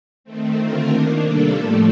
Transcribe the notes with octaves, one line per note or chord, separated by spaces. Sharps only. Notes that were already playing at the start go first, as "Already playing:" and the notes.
D#3 A3 C4
D3 A3 C4 F4 A#4
D#3 A#3 D4
C3 G3 A#3 D4 A4
A2 F3 A3